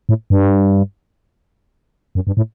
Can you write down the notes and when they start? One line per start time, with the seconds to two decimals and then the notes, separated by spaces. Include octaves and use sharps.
0.09 A2
0.30 G2
2.15 F#2
2.27 G2
2.37 A2